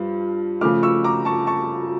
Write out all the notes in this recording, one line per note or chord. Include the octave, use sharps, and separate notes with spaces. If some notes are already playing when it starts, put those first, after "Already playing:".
Already playing: G2 F3
C#3 F3 A3 D6 F6
C#6 E6
A#5 D6
A5 C#6
A5 C#6